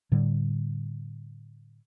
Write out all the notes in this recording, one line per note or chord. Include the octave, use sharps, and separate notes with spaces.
A2 D3 G3